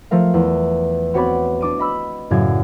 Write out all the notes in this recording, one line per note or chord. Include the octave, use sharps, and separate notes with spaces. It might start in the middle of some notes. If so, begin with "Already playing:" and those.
F3 A3 A#4 F5
E2
B3 C4 F#4 C#5 D5 B5
D4 D6 D#7
D#5 B5 E6
F#2 A2 C#3 D5 F5 G#6